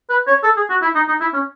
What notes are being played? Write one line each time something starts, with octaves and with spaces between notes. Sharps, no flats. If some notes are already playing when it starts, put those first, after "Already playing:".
B4
C#5
A4
G#4
F#4
E4
D#4
D#4
E4
C#4